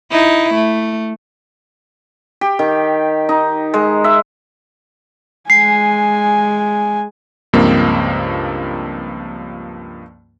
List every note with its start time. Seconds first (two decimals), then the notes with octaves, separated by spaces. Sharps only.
0.11 D#4 E4
0.54 A3
2.41 G4
2.59 D#3
3.29 D#4
3.74 G#3
4.04 E5
5.50 G#3 G#5 C7
7.53 C#2 G2 F3 A#3 C4